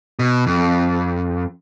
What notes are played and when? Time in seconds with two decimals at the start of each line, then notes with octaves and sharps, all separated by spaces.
0.19 B2
0.47 F2